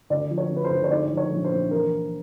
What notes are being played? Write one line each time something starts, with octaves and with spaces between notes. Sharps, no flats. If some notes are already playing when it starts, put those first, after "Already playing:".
D2 D5
F3
C#5
D3
B4
C5
D2
C#5
G#2 D5
F3
C#5
A#1
C5
A#1
E3 A#4